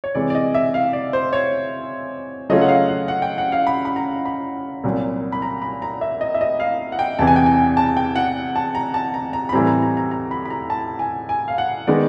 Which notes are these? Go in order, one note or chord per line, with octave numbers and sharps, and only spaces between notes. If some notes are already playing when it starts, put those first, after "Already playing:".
C#5
C3 E3 G#3 D5
D5
D#5
E5
F5
D5
C5
C#5
C#3 F#3 A3 C#4 F4 D#5
F#5
F5
F#5
F#5
G5
F#5
F5
B5
B5
A#5
B5
C2 A#2 F#3
B5
A#5
B5
A#5
E5
D#5
E5
D#5
F5
F#5
G5
E2 C3 E3 A5
G#5
G5
G#5
A5
G5
F#5
A5
A#5
A5
A#5
A#5
B5
A2 E3 G3 C4 A#5
A#5
A#5
A#5
A#5
B5
B5
A#5
A5
G#5
G#5
F5
F#5
D#3 G#3 B3 D5